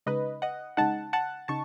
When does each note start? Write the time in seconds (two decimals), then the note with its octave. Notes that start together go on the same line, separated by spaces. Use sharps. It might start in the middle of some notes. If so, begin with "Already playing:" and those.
0.06 C#3 G#3 D#4 B4 D#5
0.42 D#5 F#5
0.77 C#3 G#3 D#4 F#5 A5
1.13 F#5 A5
1.48 C#3 D#4 A5 C#6